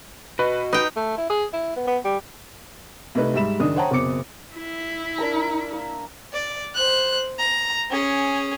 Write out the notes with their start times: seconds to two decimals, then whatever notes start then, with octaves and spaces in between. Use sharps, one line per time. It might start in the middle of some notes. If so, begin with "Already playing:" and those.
0.39 F#4 B4 D#5
0.73 D#4 B4 G5
0.96 A3
1.18 E4
1.30 G#4
1.53 E4
1.76 B3
1.87 B3
2.05 G3
3.15 C2 A3 D#4 B4
3.34 G#2 G3 E5 B5 E7
3.59 F#1 D#3 D4 D#6
3.76 C5 C#5 F#5 G5 A5 A#5
3.91 F#1 B2 C4 D6 C#7
4.55 E4
5.18 D4 A#4 A#5
5.73 A#3
6.33 D5
6.75 C5 F#6
7.39 A#5
7.90 C#4 G#4